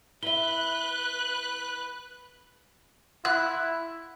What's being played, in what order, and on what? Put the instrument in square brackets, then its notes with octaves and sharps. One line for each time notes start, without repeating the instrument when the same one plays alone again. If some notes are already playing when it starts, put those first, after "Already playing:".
[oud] E4 E5 [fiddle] B4 [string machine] F#6 [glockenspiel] G7
[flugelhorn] E4 [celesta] F#5 C6 [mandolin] F#6